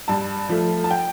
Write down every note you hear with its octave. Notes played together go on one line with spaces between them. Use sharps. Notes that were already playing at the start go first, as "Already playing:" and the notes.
G2 A5
F3 A3
A5
G5